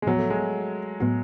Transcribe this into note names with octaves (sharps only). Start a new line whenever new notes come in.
G#3
A2 F3 F#3 B3 F#4
A3
G#3
A2 F#3 B3 F#4